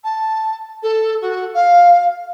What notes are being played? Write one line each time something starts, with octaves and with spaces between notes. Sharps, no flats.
A5
A4
F#4
F5